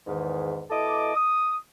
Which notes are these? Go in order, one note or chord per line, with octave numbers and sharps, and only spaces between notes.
E2 G#2 D#3
B2 E4 A4 D#5 D6
D#6